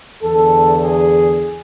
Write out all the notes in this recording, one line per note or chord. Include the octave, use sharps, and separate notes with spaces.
E2 D3 A4
G#4